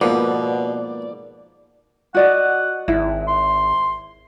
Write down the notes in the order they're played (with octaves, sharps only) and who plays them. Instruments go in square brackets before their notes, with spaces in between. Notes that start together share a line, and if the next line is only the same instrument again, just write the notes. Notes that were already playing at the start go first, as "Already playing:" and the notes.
[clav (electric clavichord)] G#2 F3 B3 [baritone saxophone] B2 [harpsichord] A#3 [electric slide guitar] D5
[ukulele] F#4 D5 D#5 [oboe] F#5
[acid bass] G#1 [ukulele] E4
[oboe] C6